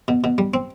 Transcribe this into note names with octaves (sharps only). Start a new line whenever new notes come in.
B2
B2
G3
C4